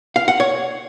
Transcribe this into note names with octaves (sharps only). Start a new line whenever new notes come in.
F5
F#5
C#5